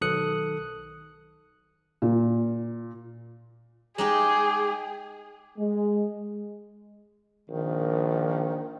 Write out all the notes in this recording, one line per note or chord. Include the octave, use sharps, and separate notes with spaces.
B1 D#3 A4 D#6 F#6 C#7
A#2
G#3 D#4 G4 G#4 D6
G#3
A#1 D#3